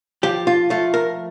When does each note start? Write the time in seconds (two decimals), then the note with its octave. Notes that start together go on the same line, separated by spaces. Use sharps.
0.23 F3 G4
0.47 F4
0.70 A3 F4
0.94 A#4